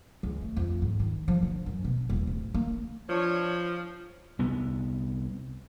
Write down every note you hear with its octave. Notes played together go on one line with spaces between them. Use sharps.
C#2
A3
F2
G#2
D#3
F3
D3
F#2
B2
D#1
D1
A#3
F3 D4 C#5
C2 B3